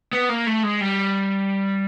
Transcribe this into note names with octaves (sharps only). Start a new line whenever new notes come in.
B3
A#3
A3
G#3
G3